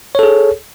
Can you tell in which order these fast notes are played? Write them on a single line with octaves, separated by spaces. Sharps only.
C#5 A4 G#4